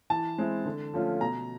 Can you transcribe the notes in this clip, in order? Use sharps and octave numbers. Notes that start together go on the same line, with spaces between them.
E3 A5
G#3 C4 E4
D3
F3 A3 C#4 F4
B2 A#5